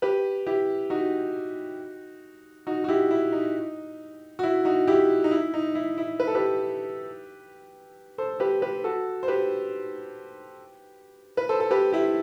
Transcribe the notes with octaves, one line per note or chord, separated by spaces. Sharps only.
G4 B4
E4 G4
D#4 F#4
D#4 F#4
F#4
E4 G4
E4
D#4
F#4
E4
D#4 F#4
E4 G4
D#4
E4
D#4
E4
E4
B4
A4
G4 B4
A4 C5
G4 B4
G4 B4
F#4 A4
C5
G4 B4
B4
A4 C5
A4
G4 B4
E4 G4